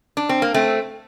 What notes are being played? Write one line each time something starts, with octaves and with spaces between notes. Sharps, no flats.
D4
C4
A#3
A3 C4